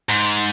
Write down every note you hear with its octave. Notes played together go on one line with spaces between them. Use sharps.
G#2